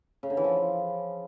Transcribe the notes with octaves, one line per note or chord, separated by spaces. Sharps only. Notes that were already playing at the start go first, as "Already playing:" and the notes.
C#3
D3
E3
F3